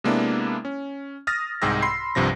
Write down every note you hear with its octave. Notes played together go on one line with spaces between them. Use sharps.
C3 G#3 A#3 B3 D4 E4
C#4
D#6 F6 A6 A#6
C2 G#2 G#4 G5 E6 A#6
B5 C6 C7
C2 G2 C3 F3 A#6